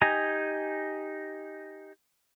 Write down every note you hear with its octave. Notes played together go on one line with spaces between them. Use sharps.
D#4 G4 D#5 G#5 A#5